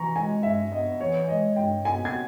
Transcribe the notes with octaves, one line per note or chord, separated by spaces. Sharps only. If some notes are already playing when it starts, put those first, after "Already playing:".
Already playing: E3 A#5 C#6
G#3 G#5
G2 E5
B3 D#5
E3 C#5
G#3 D#5
G2 G5
B3 G#5
G#6